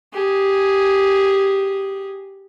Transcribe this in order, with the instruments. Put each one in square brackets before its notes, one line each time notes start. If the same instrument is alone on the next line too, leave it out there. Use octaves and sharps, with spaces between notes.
[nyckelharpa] G4 G#4